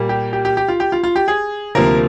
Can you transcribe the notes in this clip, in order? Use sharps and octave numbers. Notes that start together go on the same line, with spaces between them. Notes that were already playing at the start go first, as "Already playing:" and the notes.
Already playing: A#2 G3 A#3
G4
G4
G4
G4
F4
G4
F4
F4
G4
G#4
D2 C3 F3 A#3 A#4